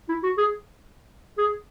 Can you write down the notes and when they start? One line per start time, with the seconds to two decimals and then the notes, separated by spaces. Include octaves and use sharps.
0.09 E4
0.23 F#4
0.38 G#4
1.38 G#4